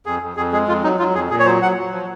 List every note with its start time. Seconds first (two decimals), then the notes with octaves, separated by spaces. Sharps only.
0.06 F2 G#4
0.22 F2
0.37 F2 G#4
0.52 G#3 G#4
0.68 F2 F4
0.83 F#3 D#4
0.99 F#3 F4
1.14 F2 G#4
1.31 A#2 G#4
1.39 C#5
1.45 F#3 C5
1.62 F#3 F#5
1.77 F#3
1.92 F3